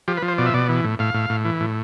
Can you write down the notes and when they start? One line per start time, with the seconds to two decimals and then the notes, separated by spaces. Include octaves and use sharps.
0.08 F3 G4
0.17 B4
0.22 F3
0.28 C5
0.38 B2 D5
0.46 E5
0.54 B2 D5
0.69 E3
0.84 A2
0.99 A2 F5
1.14 A2
1.30 A2
1.45 E3
1.61 A2